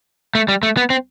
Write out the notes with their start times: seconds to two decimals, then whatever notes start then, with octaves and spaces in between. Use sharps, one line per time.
0.35 A3
0.48 G3
0.63 A3
0.77 B3
0.90 C4